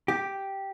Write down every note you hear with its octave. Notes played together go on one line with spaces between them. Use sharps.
G4